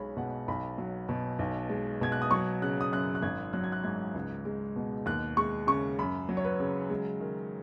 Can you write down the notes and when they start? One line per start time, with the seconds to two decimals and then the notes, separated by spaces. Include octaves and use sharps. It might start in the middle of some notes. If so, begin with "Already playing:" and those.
Already playing: B1 G#3 C#5 B5
0.17 B2 F#5
0.48 B1 B5
0.78 F#3
1.09 B2
1.39 B1
1.69 G#3
2.01 B2 G#6
2.12 F#6
2.22 D#6
2.31 F#3 C#6
2.62 C#3 F#6
2.81 D#6
2.92 F#2 F#6
3.15 F#6
3.22 G#1 G#6
3.53 F#3 F#6
3.64 G#6
3.72 F#6
3.84 G#2 G#6
4.14 C#2
4.45 G#3
4.76 B2
5.06 D#2 F#6
5.37 G#3 C#6
5.67 C#3 C#6
5.99 F#2 B5
6.29 F#3
6.37 C#5
6.45 B4
6.60 C#3
6.90 G#3
7.21 D#3